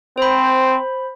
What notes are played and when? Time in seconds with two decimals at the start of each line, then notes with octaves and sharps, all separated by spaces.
0.18 C4 C5 B5